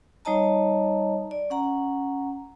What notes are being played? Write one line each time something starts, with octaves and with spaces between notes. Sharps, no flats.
G3 D#4 C#5 D#5 A5 A#5
D5
C#4 F#5 A#5